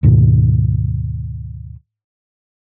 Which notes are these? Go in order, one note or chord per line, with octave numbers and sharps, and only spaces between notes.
D2 G#2 B2 D#3